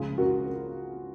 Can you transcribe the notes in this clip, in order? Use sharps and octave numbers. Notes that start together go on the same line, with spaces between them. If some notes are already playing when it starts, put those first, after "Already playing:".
Already playing: C#2 C#3 F3 F4 G#4
F#4 A#4